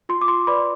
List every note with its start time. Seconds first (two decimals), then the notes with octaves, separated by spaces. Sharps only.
0.09 F4 C6
0.21 D6
0.28 C6
0.47 B4 D5 B5